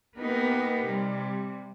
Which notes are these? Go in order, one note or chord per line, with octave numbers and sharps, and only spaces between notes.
A#3 B3 D#4 G4 A#4 B4
C3 G3